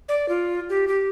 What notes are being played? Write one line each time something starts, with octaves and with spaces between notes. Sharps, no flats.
D5
F4
G4
G4